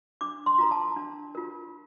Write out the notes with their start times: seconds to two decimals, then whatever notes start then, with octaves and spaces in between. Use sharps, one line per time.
0.21 D4 D6
0.46 C6
0.58 F4 A#4 A#5
0.71 A5
0.96 D4
1.35 F4 A#4